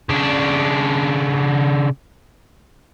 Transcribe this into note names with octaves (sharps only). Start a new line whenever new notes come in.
C#3 D4